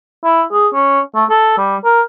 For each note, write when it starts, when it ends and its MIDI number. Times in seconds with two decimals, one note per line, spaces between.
0.24 0.43 64
0.52 0.68 68
0.74 1.00 61
1.15 1.25 57
1.30 1.57 69
1.58 1.77 55
1.84 2.02 70